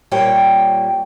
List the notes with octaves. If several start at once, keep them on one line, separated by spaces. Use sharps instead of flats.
A#2 G3 C#5 G5